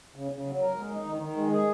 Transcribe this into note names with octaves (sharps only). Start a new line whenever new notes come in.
C#3
C#3
F#3
A#4
G#3
D#4
D#3
D#3
G#3
G#4